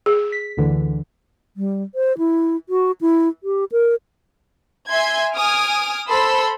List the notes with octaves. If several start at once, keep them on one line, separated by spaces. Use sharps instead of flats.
G#4
B6
D2 D3 E3
G3
C5
E4
F#4
E4
G4
A#4
E5 G#5 C6 G#6
G#5 D#6 F6 D7
A4 C5 B5 C6 E6